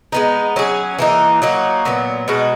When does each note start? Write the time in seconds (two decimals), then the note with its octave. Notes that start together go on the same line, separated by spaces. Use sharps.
0.12 G#3 B3 D#4
0.56 F#3 C#4 G#4
0.99 E3 A#3 D#4
1.42 F#3 A#3 D#4 F#4
1.85 A#2 F#3 B3
2.28 B2 G#3 D#4 F#4